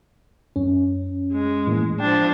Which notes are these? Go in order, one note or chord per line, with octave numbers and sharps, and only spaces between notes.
F#2 C#4
G#3
A2 E3 A#3
F3 D4 G5